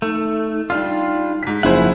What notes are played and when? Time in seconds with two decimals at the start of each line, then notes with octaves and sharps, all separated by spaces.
0.02 A3 D#4
0.70 G3 D4 F4 F6
1.43 G#2 B6
1.63 F#1 F3 E4 G#4 C5 F#5